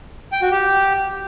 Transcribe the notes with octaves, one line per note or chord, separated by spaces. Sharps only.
G5
F#4
G4